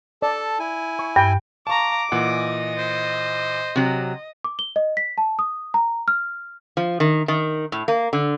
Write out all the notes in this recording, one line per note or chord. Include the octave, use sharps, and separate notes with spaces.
A4 D5 A5
E4 G#5
C#6
G2 G5
F5 A5 A#5 C#6 D6
A#2 E3 D#5 F#5
C5
C3 F#3
D6
G7
D#5
B6
A5
D#6
A#5
F6
F3
D#3
D#3
A2
A#3
D3